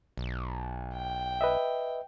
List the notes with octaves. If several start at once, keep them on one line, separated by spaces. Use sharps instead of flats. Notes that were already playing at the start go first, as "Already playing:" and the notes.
B1
G5
B4 D#5 E5